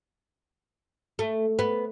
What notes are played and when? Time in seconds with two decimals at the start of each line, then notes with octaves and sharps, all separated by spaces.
1.19 A3
1.59 B3